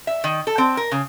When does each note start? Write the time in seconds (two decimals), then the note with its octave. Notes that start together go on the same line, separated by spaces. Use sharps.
0.07 E5
0.24 D#3
0.47 A4
0.58 C4
0.77 A#4
0.92 C#3